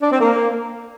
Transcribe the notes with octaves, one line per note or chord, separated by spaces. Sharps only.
D4
C4
A#3